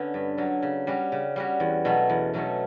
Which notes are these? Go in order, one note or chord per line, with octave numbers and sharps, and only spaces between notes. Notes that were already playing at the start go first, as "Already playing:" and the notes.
Already playing: D3 B3 C#4
G2
D3 F#3 C#4
C#3
G3 C#4 F#4
C#3
G3 C#4 F#4
E2
B2 F#3 A3 C#4
E2
B2 F#3 A3 C#4